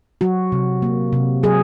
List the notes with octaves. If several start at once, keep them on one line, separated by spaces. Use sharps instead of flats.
F#3 F#4
C3
A#3
C3
F#3 G#4